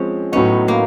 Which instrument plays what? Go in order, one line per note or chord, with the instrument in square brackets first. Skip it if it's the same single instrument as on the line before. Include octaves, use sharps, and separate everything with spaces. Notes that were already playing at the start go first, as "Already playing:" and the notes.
Already playing: [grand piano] F3 G#3 C4 [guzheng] C#4
[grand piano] A2 F#3 B3 D#4 [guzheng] C#4
[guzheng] A#3